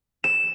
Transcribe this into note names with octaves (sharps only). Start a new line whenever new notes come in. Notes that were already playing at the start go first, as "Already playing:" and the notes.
E7